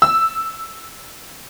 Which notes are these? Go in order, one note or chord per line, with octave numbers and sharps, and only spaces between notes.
E6